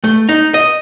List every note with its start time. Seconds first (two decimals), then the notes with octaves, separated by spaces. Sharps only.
0.04 A3
0.29 D#4
0.54 D#5